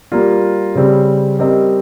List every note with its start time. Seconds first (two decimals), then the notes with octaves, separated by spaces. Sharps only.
0.12 G3 A#3 F4
0.75 C#3 G3 C4
1.39 G3 C4 G4 A#4 D#5